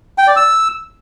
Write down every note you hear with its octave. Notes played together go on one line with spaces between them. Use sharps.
G5
D5
E6